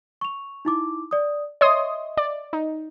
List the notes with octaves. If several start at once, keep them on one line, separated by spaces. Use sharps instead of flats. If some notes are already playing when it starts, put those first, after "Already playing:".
C#6 F7
D#4 E4 D6
D5 D#6
C#5 D#5 E5 C6 D#6
D5
D#4